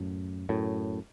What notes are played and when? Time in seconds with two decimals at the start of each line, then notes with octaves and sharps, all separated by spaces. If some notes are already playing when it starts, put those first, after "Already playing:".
Already playing: F#2 A2
0.49 F#2 A2